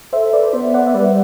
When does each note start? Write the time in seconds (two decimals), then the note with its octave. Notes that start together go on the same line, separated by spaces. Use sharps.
0.13 A4 C5 E5
0.33 B4 D5
0.53 B3 C5
0.74 D5 F#5
0.87 E5
0.94 G3 B4 D5